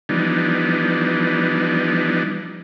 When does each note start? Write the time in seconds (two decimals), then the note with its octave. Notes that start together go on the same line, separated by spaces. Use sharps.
0.09 E3 F3 G3 B3 D4 D#4